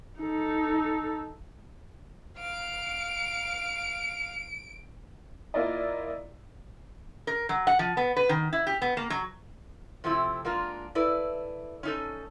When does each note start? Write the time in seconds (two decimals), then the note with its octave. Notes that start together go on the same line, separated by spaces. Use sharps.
0.19 D#4 A4
2.39 F5 D7
5.54 A#3 E4 F4 D5 D#5
7.27 A#4
7.49 F#3
7.67 F#5
7.79 F3
7.97 B3
8.16 B4
8.29 D#3
8.53 E4
8.67 G4
8.82 B3
8.97 A#3
9.10 F#3
10.04 C3 F3 A3 C4 E4
10.45 G#3 A#3 D4 F4
10.95 E4 A4 B4 D5
11.83 C#4 D#4 A4